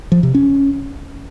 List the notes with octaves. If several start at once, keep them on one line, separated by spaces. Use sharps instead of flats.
F3
C3
C#4